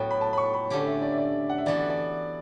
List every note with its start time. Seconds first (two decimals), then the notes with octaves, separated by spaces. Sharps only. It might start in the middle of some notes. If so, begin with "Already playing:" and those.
Already playing: A2 F#3 B3 F#4 G5
0.11 B5
0.21 A5
0.33 B5
0.38 C#6
0.54 B5
0.70 D3 A3 C#4 G4
0.86 E5
1.02 D5
1.12 E5
1.18 D5
1.49 F#5
1.58 E5
1.66 E3 B3 F#4 A4 D5
1.90 D5